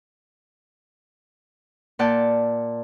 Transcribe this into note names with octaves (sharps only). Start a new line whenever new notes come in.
A#2 D5 F#5 A5 G6